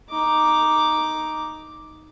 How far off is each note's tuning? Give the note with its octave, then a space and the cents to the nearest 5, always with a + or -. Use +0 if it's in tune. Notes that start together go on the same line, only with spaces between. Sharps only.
D#4 +0 D6 +0